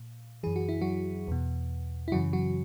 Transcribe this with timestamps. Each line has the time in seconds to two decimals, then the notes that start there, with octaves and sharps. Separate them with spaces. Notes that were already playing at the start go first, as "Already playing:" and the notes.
Already playing: A#2
0.43 F#2 E3 G#4
0.56 F#4
0.69 E4
0.81 F#3 F#4
1.28 E2 B2
2.08 E4
2.12 F#2 C#3 E3 F#3 F#4
2.33 F#3 F#4